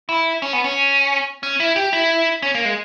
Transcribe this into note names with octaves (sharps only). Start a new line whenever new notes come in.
E4
C#4
B3
C#4
C#4
E4
G4
E4
C#4
A#3
G#3